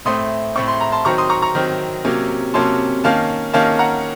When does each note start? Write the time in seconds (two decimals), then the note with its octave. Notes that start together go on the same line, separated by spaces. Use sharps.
0.05 A2 A3 C4 C6 D#6
0.55 A2 A3 C4 C#6
0.68 C6
0.80 A#5
0.92 A5 C6
1.05 D#3 F#3 C4 A#5 C#6
1.18 C6 D#6
1.29 A#5 C#6
1.42 A#5 C#6
1.55 D#3 F#3 C4
2.05 C3 F#3 A#3 C#4
2.54 C3 F#3 A#3 C#4 A5 C6
3.04 D#3 A#3 C#4 F5 A5
3.53 D#3 A#3 C#4 F5 A5
3.79 F#5 A#5